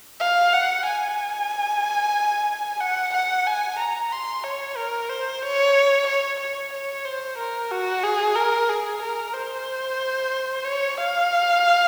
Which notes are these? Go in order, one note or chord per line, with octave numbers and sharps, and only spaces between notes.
F5
F#5
G#5
F#5
F#5
G#5
A#5
C6
C#5
A#4
C5
C#5
C#5
C#5
C#5
C5
A#4
F#4
G#4
A#4
G#4
A#4
C5
C#5
F5